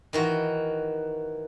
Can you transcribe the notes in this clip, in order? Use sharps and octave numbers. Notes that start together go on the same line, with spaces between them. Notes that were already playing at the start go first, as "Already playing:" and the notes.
D#3 E3 F#4